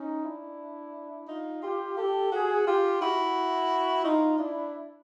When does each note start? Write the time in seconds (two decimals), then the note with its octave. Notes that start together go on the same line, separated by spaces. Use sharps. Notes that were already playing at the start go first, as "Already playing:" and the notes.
Already playing: C#4 D#4
0.24 D4 E4
1.28 D#4 F4
1.62 F4 G4
1.97 G4 A4
2.32 F#4 G#4
2.66 F4 G4
3.00 E4 F#4
4.05 D#4 F4
4.39 D4 E4